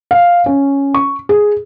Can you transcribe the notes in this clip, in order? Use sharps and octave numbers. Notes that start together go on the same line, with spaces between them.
F5
C#4
C#6
G#4